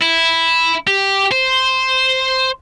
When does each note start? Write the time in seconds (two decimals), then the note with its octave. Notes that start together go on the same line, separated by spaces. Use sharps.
0.01 E4
0.87 G4
1.31 C5